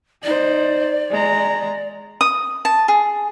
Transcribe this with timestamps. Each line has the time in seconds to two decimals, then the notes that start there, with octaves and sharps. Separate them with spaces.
0.23 D#4 C5 D5
1.11 G#3 A#5
2.21 D#6
2.65 A5
2.88 G#4